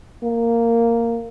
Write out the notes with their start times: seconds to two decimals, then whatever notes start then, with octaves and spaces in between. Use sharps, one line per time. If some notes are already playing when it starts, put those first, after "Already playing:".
0.23 A#3